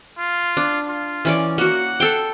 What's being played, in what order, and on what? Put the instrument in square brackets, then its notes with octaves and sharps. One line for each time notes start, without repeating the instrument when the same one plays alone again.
[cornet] F4
[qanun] D4
[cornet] F4
[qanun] E3 C#4 D5
[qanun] A#3 F#4 [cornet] F#5
[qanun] A4 F5 G5